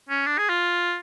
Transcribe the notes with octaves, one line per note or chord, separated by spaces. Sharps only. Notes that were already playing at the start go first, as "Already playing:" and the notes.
C#4
D4
G#4
F4